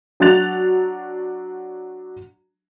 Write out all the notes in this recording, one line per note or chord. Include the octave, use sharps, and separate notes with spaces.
F#3 D4 F#4 F#6 A6 F7